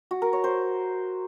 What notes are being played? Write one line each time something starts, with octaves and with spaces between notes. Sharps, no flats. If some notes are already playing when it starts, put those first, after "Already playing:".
F#4
A#4
C#5
C5